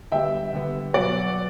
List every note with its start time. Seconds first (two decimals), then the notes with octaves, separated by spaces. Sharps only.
0.12 D3 G3 B3 E5 G5
0.53 D3 G3 B3
0.93 B2 F#3 B3 D5 F#5